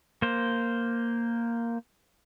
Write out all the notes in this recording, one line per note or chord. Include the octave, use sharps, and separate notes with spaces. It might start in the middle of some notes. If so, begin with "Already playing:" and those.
A#3 C5